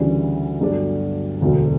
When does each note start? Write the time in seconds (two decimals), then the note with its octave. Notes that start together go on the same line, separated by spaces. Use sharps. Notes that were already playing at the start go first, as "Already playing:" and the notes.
Already playing: D2 C#3 E3 G3 D4
0.61 G1 G2 F#3 A3 D4
1.41 E1 D2 D3 F#3